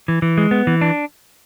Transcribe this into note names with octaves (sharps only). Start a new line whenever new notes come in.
E3
E3
G#3
B3
E3
D4